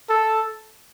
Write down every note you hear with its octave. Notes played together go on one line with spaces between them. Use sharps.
A4